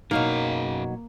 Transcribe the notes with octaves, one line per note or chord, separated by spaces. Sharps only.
F#2 B2 F#3 A#3 D#4 F5